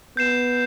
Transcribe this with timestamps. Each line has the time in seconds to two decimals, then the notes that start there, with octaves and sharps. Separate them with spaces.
0.17 B3 G6 C7 E7